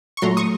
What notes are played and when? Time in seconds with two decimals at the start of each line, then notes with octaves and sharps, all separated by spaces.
0.17 C#6
0.22 A#2 F#3 A3 A#5 C6
0.37 C#6 D#6